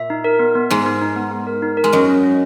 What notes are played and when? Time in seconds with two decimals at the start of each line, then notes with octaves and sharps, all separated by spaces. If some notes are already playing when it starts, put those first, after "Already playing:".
Already playing: A#2 E5
0.10 D#4
0.24 A#4
0.39 B3
0.55 B3
0.70 G#2 G#3 D#4
0.86 D#4
1.02 D#4
1.16 B3
1.31 B3
1.47 A#4
1.62 D#4
1.77 A#4
1.84 G#3
1.92 F#2 F#3 D#5
2.08 C#4
2.23 C#4